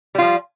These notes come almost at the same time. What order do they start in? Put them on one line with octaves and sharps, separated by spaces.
G3 F4 F3